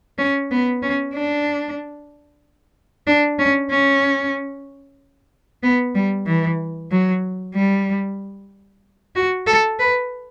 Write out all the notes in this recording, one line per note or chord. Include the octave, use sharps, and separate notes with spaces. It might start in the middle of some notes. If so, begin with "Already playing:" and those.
C#4
B3
C#4
D4
D4
C#4
C#4
B3
G3
E3
F#3
G3
F#4
A4
B4